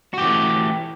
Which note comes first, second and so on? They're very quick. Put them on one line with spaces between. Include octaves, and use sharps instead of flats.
F#4 G4 E3 A3